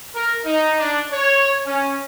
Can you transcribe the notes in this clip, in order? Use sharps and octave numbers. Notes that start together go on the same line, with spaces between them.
A#4
D#4
D4
C#5
C#4